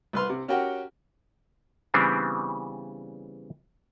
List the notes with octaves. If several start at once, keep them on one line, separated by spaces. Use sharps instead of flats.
C2 B4 C6 F6
C3
C#4 F#4 G4 A#4 F#5 G5
C#3 E3 G3 B3 C4 D4